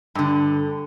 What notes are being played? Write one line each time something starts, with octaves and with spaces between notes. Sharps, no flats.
G2 D3